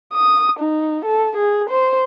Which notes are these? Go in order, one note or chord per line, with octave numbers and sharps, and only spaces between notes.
D#6
D#4
A4
G#4
C5